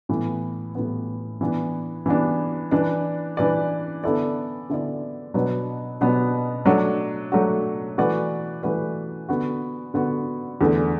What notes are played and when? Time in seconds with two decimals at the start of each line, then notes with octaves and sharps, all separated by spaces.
0.09 A2 E3 B3
0.75 A2 E3 B3
1.41 E3 B3 D4
2.06 E3 B3 D4
2.71 E3 D4 B4 D5
3.37 E3 D4 B4 D5
4.04 D3 B3 E4 A4 D5
4.70 D3 B3 E4 A4 D5
5.34 B2 F#3 B3 D4 B4
6.01 B2 F#3 B3 D4 B4
6.66 F#3 A3 D4 F#4
7.32 F#3 A3 D4 F#4
7.98 E3 A3 F#4 B4 D5
8.63 E3 A3 F#4 B4 D5
9.29 D3 B3 F#4
9.94 D3 B3 F#4
10.61 E2 D3 A3